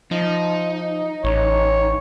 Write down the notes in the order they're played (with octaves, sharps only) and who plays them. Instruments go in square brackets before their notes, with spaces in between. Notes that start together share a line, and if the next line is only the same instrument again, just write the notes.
[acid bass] F3 [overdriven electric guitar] D#4
[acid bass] A1 [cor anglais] C#5